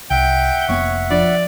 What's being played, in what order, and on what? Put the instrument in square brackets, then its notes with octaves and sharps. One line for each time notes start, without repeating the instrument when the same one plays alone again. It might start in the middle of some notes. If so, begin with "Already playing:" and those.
[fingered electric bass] C2 [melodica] E5 F#5 [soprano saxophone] G5
[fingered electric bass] F1 A#3 B3 [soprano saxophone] C#5
[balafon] F3 D4 F4 [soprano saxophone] D5